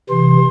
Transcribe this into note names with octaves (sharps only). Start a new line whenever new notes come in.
C3 E3 C6